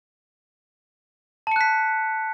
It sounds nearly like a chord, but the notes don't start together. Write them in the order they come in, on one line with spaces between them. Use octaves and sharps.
A5 C#7 F#6 B6